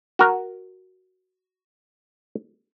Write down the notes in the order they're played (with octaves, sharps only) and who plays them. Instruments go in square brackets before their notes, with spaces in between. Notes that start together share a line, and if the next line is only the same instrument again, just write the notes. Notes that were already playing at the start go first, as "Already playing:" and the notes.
[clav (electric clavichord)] F#4 A#4